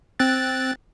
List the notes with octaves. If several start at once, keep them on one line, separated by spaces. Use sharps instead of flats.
C4 F#6 A6